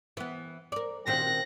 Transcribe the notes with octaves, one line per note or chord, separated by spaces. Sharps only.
E3 B3
A#4 D5
A#2 D#3 C4 F#6 A#6